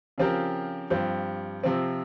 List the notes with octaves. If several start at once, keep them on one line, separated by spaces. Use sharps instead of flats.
C#3 F3 C4 G4 A#4
G2 F3 C4 G4
C3 F3 C4